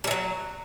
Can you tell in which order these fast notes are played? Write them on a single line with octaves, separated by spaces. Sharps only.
G3 E3 F#3